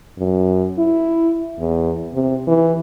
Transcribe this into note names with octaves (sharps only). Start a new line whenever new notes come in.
F#2
E4
E2
C3
E3